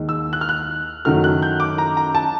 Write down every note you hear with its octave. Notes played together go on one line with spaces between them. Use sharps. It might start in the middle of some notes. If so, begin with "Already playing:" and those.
Already playing: D#2 D#3 G#3
E6
F#6
F6
F#6
F#2 D#3 F#3 A3 F6
F#6
G6
D6
A#5
A#5
A5